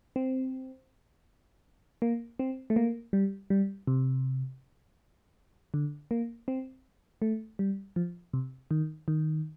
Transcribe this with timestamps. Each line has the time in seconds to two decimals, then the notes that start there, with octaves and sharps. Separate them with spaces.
0.16 C4
2.02 A#3
2.39 C4
2.70 A3
2.76 A#3
3.13 G3
3.50 G3
3.87 C3
5.74 D3
6.11 A#3
6.48 C4
7.22 A3
7.59 G3
7.96 F3
8.33 C3
8.71 D#3
9.08 D#3